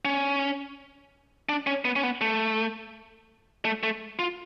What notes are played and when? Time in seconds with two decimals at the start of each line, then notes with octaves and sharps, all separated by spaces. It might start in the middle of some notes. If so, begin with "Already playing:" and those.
0.05 C#4
1.49 D4
1.67 C#4
1.85 B3
1.96 C#4
2.03 B3
2.21 A3
3.65 A3
3.83 A3
4.19 F4